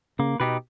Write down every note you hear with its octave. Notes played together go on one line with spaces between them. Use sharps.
C#3 A#3
B2 D#4 G4 B4